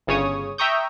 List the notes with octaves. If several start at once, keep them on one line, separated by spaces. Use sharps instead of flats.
G1 C#3 C#5 D#6
E5 G5 A#5 C#6 D#6 G6